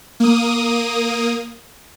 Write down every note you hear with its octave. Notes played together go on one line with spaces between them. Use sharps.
A#3 D#6